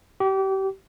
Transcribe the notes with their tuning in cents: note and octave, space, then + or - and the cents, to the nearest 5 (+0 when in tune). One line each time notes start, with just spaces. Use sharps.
G4 -30